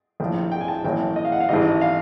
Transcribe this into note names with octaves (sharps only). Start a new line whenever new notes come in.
A#1 A2 F3 G5
G5
G#5
A5
A1 A2 F#3 A#3 G5
D#5
F5
F#5
F5
A1 G#2 E3 G3 D#5
F5